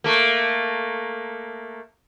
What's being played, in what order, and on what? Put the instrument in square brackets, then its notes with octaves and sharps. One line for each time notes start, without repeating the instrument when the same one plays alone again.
[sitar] A3 A#3